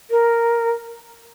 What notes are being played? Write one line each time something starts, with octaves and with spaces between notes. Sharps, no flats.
A#4